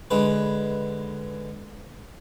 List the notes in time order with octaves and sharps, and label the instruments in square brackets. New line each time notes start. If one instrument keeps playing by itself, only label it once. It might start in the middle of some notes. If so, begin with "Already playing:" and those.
[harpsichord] D3 G#3 B4